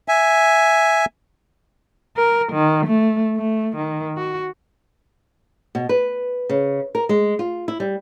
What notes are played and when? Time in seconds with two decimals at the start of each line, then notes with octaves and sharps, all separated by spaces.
0.08 E5 G#5
2.17 A#4
2.53 D#3
2.86 A3
3.36 A3
3.77 D#3
4.17 F#4
5.75 B2
5.89 B4
6.50 C#3
6.95 A#4
7.09 G#3
7.39 F4
7.68 E4
7.80 G3